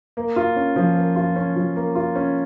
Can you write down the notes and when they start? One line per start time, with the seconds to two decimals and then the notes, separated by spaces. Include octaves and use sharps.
0.17 A#3
0.36 F4
0.56 C#4
0.76 F3
0.96 A#3
1.16 F4
1.36 C#4
1.56 F3
1.76 A#3
1.95 F4
2.15 C#4